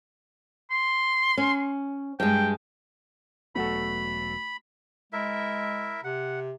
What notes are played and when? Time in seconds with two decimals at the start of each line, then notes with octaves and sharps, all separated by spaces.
0.71 C6
1.38 C#4
2.20 G2 G#3 G5
3.55 E1 F#3 A3 B3 F#4 A4 B5
5.13 G#3 E4 A#4 E5
6.04 C3 F#5